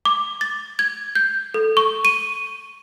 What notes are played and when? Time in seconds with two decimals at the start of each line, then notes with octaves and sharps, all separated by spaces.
0.05 D6
0.41 A6
0.79 G#6
1.15 G6
1.54 A4
1.77 C#6
2.05 D#7